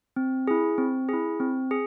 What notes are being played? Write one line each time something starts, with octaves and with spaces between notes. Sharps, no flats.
C4
E4 G#4
C4
E4 G#4
C4
G#4